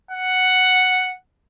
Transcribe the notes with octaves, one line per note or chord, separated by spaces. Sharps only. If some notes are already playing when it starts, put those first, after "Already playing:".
F#5